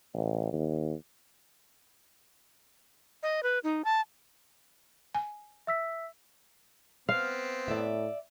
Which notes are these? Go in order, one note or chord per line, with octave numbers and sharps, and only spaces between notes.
A1
D#2
D#5
B4
D#4
A5
G#5
E5 E6 B6
B3 C4 F5
A2 D5 E5